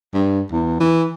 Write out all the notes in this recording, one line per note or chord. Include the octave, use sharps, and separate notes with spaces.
G2
E2
E3